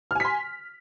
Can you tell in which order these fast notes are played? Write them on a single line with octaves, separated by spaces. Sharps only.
F6 G#5 B6 C6